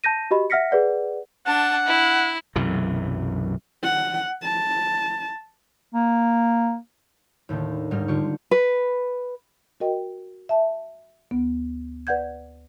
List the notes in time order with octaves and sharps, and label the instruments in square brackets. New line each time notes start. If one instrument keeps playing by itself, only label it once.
[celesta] A5 G6 A#6 D#7
F#4 G4 D#5 B5
E5 F#5 F6 A#6 B6 C#7
G#4 B4 D5 F#5
[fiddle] D4 A5 [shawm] F#5
[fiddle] E4
[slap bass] B1 F#2 C3 E3
[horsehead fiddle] F#5
A5
[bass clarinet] A#3
[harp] D#2 A2 D3 D#3
G#2 G3 D#4 F6
D3 F4 G4 C#6
[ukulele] B4
[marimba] F#4 A#4 D#5 G5
E5 A5
D2 B3
B4 D5 F#5 G6 G#6